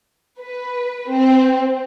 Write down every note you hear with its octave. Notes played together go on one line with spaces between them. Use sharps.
B4
C4